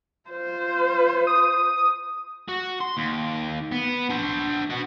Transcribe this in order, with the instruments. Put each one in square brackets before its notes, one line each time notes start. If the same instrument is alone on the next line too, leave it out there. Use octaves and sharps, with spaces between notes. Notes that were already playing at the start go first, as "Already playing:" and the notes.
[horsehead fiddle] F4 C5
[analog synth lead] D#6
[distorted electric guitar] F#4
C6
D#2
B3
D4 C5
B3 F#4